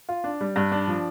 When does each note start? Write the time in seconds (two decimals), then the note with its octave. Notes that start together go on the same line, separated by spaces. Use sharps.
0.09 F4
0.24 D4
0.41 G3
0.56 G2
0.72 D4
0.88 F3